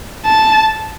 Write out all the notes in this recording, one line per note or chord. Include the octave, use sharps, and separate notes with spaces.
A5